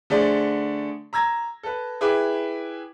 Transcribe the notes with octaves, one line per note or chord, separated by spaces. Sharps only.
D3 A3 G#4 C5 D5
A#5 E6 G#6 A#6
A4 B4
E4 G#4 B4 G5 D6